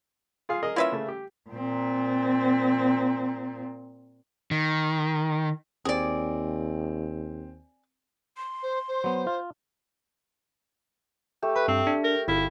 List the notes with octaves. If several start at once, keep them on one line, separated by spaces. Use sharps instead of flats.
F4 G#4 F5
G#4 A#4 D#5
A#3 C#4 E4 F4 B4 E5
C#3 A3
G4
A#2 C4
D#3
D#2 C4 G#4 D5
C6
C5
C5
F#3 B3
F4
A3 G4
B4 B5
G2 C4
D4
A#4
G1 E4 F5